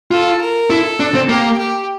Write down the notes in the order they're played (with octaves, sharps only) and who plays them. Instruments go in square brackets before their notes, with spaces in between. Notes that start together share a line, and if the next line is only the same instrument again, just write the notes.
[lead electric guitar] F4 [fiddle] A4
[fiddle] A#4
[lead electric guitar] E4 [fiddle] A4
[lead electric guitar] D4
C4
[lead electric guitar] A#3 [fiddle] G4
[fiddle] G4